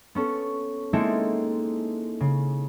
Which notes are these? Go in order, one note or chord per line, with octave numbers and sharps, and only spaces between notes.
B3 C#4 A4
G#3 A#3 C4 D#4 E4 A4
C#3